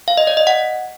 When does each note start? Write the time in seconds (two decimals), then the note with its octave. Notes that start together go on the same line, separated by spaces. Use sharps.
0.08 F5
0.17 D#5
0.27 D5
0.37 D#5
0.47 F#5